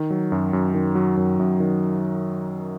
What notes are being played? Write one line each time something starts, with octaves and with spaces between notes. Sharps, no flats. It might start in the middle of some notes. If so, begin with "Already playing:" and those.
Already playing: D#3
F#3
F#2
F#2
D#3
F#3
F#2
F#2
D#3